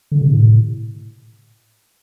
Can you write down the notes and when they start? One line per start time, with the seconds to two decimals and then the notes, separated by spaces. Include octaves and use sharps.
0.11 D3
0.21 C3
0.32 A2